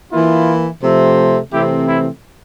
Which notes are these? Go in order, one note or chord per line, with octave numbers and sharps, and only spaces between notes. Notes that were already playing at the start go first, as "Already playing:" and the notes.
E3 A#3 E4 F4
C3 F3 A3 C4
C3 E3 A3 C4 E4 G4
E4